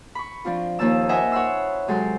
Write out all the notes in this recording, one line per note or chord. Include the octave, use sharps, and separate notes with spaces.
B5 C#6
F3 C4 D4 F4
D#2 F3 A#3 D#4 A5 E6
C5 D#5 E5 F#5 G#5
C#5 F#5 B5 C6 E6
C3 F#3 G#3 A4 G5 C6